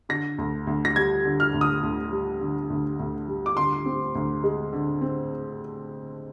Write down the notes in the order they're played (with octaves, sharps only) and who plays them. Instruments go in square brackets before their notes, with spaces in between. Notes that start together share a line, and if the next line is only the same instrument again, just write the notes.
[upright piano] D3 A#6
D2
D2
A#6
G3 G#6
D3
F6
D2
D#6
D2
G3
D3
D2
D2
G3
D6
D3 C6
C4
D2
G#3
D3
C4